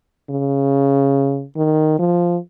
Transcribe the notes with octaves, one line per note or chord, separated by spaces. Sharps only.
C#3
D#3
F3